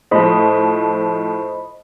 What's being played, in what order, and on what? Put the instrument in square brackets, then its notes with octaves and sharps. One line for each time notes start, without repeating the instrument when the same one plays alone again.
[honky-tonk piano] A2 F3 [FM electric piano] C5 D#5 B5